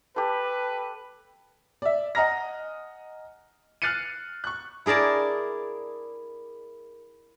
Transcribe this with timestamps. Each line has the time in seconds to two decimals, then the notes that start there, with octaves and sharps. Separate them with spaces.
0.16 G4 A4 B4
1.82 D5 E5
2.15 D#5 F#5 G#5 A#5 F6 A#6
3.82 F6 F#6 A6 C7 C#7 D#7
4.44 C#6 F#6
4.86 E4 G#4 A#4 D5 A5